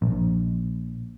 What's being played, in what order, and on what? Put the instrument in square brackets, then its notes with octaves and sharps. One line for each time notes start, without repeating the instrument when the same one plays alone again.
[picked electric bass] A#1